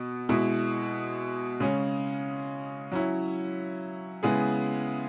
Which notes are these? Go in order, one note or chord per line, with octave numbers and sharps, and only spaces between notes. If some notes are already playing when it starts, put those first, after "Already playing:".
Already playing: B2 B3
B2 G#3 E4
C#3 G#3 C#4
F#3 C#4 E4
C#3 G#3 B3 E4 G#4